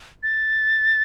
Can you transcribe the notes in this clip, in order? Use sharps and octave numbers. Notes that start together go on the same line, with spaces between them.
A6